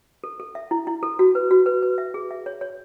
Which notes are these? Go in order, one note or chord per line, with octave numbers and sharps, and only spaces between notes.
A4
A4
E5
E4
E4
A4
F#4
B4
F#4
B4
B4
E5
G#4
E5
C#5
C#5